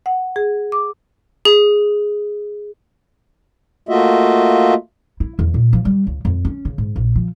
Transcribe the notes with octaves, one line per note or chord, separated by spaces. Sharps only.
F#5
G#4
D6
G#4
A3 A#3 F4 F#4 D#5 E5
E4
E2
A#2
F3
G3
C#2
F2
C#4
C#3
G#2
A#1
F3